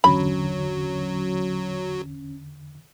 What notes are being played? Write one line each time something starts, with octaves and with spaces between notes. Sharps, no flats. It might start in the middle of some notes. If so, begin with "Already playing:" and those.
G1 E2 D3 F#3 C#4 B5